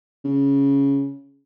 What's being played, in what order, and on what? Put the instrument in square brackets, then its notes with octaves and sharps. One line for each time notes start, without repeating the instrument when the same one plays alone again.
[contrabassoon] C#3